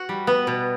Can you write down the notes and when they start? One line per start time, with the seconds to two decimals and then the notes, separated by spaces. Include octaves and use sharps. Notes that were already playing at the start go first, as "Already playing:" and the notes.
Already playing: F#4
0.09 G3
0.27 B3
0.47 B2